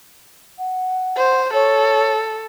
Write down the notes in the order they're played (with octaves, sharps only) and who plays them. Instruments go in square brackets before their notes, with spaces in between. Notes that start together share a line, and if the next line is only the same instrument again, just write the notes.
[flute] F#5
[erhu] C5
[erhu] A4 [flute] C#5